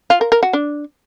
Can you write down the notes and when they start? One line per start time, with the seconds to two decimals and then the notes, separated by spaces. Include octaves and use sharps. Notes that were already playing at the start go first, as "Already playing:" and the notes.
0.10 F4
0.21 A#4
0.32 A#4
0.43 F#4
0.53 D4